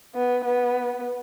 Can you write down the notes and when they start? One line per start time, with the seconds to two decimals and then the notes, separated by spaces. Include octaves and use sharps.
0.15 B3
0.45 B3